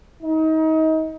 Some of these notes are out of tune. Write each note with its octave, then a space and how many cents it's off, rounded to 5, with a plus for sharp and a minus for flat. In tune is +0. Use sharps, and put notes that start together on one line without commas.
D#4 +30